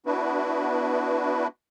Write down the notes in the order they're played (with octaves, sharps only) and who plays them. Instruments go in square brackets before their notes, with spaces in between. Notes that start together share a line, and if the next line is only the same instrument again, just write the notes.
[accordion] B3 D4 E4 F#4 B4